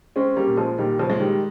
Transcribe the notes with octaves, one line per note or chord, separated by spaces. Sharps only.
G#3 C4 C#4
G3 A#3
A#2
F3 G#3
A#2 D#3 G3
C#3 F3
G#3
D#3 G3